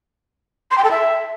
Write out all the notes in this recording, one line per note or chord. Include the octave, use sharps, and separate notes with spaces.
C6
G5
A4
E5